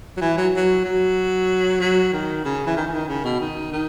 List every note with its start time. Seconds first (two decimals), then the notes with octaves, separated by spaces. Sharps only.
0.17 F#3
0.21 E3
0.37 F#3
0.56 F#3
0.85 F#3
1.81 F#3
2.13 D#3
2.45 C#3
2.67 E3
2.77 D#3
2.87 E3
2.92 D#3
3.08 C#3
3.24 B2
3.40 D#3
3.72 D#3